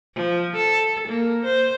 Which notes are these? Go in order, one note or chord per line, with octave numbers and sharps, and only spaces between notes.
F3
A4
A#3
C5